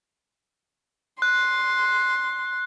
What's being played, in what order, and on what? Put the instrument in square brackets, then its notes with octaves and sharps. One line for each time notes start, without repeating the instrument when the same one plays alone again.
[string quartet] C6 [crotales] F#6